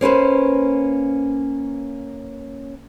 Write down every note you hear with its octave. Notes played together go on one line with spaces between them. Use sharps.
A#3 C#4 B4 C5